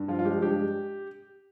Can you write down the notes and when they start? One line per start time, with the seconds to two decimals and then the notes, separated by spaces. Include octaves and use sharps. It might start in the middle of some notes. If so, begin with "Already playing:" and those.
Already playing: G2
0.08 F3 F4
0.19 F4
0.25 G#3 G4
0.42 G2 G4